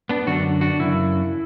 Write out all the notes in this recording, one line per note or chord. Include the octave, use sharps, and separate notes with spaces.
B3 D4
F#2 D3 D4 F#4
D4 F#4
F#2 C#3 E4